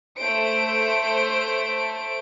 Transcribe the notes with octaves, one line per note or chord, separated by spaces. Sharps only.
A3 C5 D7